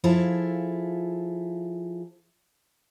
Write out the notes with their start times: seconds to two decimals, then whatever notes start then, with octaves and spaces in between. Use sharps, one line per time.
0.04 F3 E4 F4 G#4 A4 E5